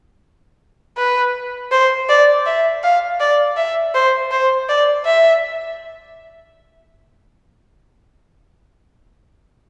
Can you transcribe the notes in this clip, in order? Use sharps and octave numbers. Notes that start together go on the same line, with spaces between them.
B4
C5
D5
E5
F5
D5
E5
C5
C5
D5
E5